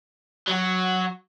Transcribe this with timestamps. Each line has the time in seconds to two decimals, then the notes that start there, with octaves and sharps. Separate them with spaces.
0.47 F#3 F#4